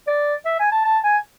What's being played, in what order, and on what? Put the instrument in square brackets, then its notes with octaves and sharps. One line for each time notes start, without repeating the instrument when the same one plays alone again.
[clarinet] D5
E5
G#5
A5
A5
G#5